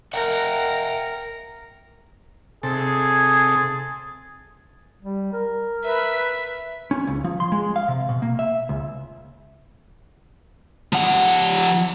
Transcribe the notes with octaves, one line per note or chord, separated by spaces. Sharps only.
A#4 E5 F#5 G5
C3 G#4 A4
G3
A#4
B4 E5
C#4
C#2
F3
C6
G#3
F5
C3
B2
A#3
E5
C#2
F3 F#5